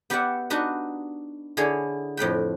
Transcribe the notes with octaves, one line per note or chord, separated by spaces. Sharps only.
B3 G4 B4 D5 E5 F#5
D4 D#4 F#4 B4 D#5
D3 E4 G#4 C#5 D5
F2 A2 B4 G5